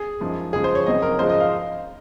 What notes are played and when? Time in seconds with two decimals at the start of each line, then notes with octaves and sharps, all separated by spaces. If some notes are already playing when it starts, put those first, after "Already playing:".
Already playing: G#4
0.21 F#2 F3 G#3 D#4
0.53 C#3 F3 G#3 G#4
0.64 C5
0.75 C#5
0.86 C#2 C#3 F#3 C4 D#4 D#5
1.02 A#4
1.19 G#2 F3 G#3 C#4 F4 C5
1.30 D#5
1.40 F5